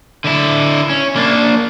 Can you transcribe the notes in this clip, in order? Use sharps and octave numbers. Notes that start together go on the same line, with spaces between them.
D3 E4
C#4
A#3 D4